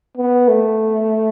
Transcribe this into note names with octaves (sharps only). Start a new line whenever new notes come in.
B3
A3